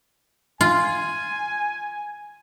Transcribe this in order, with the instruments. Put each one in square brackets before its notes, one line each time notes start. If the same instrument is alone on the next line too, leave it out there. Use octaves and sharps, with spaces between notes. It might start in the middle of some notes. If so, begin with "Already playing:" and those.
[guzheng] F4 [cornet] G#5